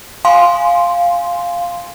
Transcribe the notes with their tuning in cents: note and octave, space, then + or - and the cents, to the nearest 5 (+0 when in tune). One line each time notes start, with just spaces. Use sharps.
F5 +0 G#5 +0 C6 +0